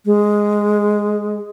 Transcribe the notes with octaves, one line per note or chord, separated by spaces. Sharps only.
G#3